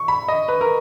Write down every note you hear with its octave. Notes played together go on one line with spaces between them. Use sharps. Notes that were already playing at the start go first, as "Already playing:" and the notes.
Already playing: C#6
B5
D#5
B4
A#4